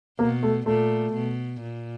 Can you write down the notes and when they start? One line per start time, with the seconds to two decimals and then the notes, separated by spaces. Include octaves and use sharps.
0.19 B2 A#3
0.43 A3
0.66 A#2 A3
1.14 B2
1.61 A#2